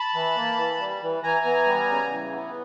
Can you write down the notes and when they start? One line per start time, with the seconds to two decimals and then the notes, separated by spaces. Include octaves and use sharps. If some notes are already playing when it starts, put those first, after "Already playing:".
Already playing: A5 B5
0.15 E3
0.36 A#3
0.58 E3
0.80 G3
1.02 E3
1.23 E3 G#5 A#5
1.45 B3
1.67 G3
1.89 C#3
2.10 E3
2.32 B3